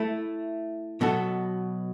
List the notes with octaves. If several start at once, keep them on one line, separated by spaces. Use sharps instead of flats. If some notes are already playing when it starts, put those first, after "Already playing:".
Already playing: A3 E4 A4
B2 F#3 B3 F#4 A4